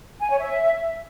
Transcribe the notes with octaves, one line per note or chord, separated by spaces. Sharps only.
G#5
C#5
E5